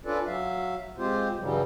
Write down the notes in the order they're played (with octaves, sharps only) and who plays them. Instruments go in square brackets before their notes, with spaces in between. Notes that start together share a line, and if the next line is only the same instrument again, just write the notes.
[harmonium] C#4 D4 F4 A4 B4 D5
F#3 E5 F5
G#3 C4 F4 G4 C5
G2 C#3 E3 F#3 G3